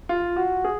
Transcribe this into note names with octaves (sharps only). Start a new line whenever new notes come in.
F4
F#4
G#4